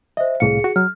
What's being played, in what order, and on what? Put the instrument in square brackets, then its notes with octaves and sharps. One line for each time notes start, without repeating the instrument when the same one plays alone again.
[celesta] C5 E5 [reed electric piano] D#5
[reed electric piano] C2 A2 F5 [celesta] G#4 C#7
[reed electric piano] F#4
[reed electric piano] F#3 [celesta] F6